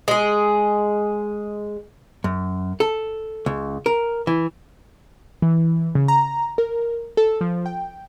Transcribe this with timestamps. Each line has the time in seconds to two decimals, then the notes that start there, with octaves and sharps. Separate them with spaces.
0.08 G#3 G#4
2.24 F#2
2.80 A4
3.46 C#2
3.86 A#4
4.27 E3
5.42 E3
5.95 C#3
6.08 A#5
6.58 A#4
7.17 A4
7.41 F3
7.66 G5